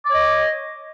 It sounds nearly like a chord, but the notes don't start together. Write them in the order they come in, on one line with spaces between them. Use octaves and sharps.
D6 C#5 D#5